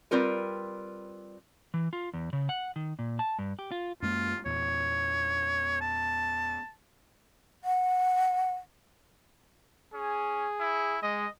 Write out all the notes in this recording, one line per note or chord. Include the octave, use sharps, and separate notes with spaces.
G3 C4 F4 A#4 B4
E3
F4
E2
C#3
F#5
D#3
A#2
A5
G2
G4
F4
F#2 G#3 A#3 F4
E2 A#2 C#5
A5
F#5
C#4 G#4
E4
G#3 D#5